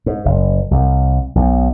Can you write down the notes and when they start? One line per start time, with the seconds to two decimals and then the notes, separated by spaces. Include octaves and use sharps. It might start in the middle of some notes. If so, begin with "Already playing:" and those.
0.06 G#2
0.25 F#1
0.71 C2
1.35 B1